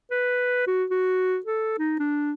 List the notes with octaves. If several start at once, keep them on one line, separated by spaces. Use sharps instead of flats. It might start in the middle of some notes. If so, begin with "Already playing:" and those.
B4
F#4
F#4
A4
D#4
D4